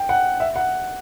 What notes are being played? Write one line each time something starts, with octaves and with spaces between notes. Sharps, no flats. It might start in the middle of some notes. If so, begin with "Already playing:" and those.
Already playing: G5
F#5
E5
F#5